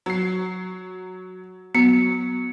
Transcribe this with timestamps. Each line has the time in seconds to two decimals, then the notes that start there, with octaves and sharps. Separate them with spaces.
0.06 F#3 C7
1.75 F#3 B3 C#7